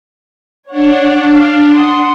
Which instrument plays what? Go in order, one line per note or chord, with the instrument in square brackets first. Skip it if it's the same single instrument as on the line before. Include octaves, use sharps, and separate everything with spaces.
[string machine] D4 [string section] C#5 F#5
[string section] F5
F#5 C6 D#6